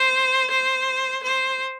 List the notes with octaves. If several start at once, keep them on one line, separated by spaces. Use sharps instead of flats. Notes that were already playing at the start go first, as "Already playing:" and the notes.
Already playing: C5
C5
C5